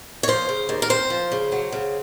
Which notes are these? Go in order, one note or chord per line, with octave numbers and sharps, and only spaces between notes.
C#5
F3 C5
C#3
D#2
A#4
C4 C5
F3
C#3
F#3
C#3